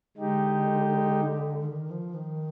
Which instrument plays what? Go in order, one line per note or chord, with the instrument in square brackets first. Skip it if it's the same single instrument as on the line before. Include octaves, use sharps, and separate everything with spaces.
[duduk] D3 [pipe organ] G#3 D#4 G4
[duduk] D#3
F3
D#3